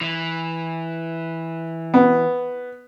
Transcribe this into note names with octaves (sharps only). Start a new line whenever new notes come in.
E3
B3